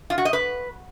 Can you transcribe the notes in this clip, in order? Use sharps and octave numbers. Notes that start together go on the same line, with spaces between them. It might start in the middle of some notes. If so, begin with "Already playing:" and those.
F4
F#4
D#5
B4